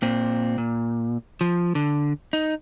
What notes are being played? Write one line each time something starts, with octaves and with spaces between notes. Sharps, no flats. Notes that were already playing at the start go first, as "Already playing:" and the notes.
A#2 C4
A#2
F3
D3
D#4